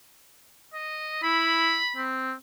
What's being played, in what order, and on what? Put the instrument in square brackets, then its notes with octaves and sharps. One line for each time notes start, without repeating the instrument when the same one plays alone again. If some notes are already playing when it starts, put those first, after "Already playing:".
[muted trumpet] D#5
[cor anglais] E4 [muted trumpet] B5
[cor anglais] C4